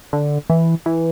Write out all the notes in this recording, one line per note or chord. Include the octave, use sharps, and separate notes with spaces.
D3
E3
E3